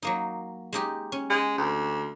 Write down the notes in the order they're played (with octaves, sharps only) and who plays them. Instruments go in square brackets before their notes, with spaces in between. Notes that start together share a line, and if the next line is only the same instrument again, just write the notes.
[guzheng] F#3 A#3 D#4
G#3 D#4 G4
C#4
[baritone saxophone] G#3
D2